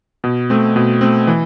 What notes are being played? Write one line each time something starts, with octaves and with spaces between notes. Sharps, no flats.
B2
A3 C4
B2
A3 C4
E3